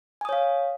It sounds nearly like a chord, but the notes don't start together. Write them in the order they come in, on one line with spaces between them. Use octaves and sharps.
G#5 D#6 C#5 F5